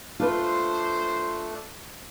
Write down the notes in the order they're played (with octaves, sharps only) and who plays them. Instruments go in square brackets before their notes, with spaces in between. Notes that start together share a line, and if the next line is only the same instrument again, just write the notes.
[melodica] A3 D4 [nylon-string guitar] F4 B4 [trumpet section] C5